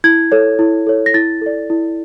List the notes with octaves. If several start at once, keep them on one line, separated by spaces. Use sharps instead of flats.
E4 G#6
A4 C#5
E4
A4 C#5
A#6
E4 A6
A4 D5
E4